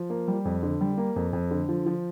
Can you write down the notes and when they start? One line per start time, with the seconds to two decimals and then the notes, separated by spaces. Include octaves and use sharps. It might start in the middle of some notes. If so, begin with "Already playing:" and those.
Already playing: F3
0.10 A#3
0.28 G3
0.45 F2
0.63 D3
0.81 G3
0.98 A#3
1.16 F2
1.33 F2
1.51 D3
1.69 F3
1.86 F3